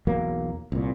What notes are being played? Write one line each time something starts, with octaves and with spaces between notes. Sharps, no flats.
B1 E2 F#3 A#3
C2 A#2